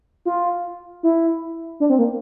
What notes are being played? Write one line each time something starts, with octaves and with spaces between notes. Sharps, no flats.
F4
E4
D4
C4
A#3